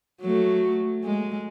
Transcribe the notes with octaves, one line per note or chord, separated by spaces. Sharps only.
F#3 A3
G#3